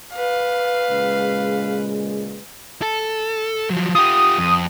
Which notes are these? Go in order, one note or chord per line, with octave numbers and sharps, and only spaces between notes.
B4 F5
A#2 C#3 G#3
A4
F3 F#3
F4 G4 D#6
F2